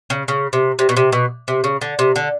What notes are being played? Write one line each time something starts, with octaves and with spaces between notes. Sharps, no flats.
C#3
C#3
C3
C3
B2
C3
B2
C3
C#3
D3
C3
D3